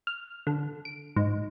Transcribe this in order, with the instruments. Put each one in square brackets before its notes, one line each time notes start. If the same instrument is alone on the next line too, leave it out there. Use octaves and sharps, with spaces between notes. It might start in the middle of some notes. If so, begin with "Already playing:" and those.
[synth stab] F6
D3
D7
G#2